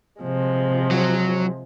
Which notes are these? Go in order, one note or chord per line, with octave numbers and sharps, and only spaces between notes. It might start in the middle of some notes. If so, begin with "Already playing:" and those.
C3 F3 G#3
F#3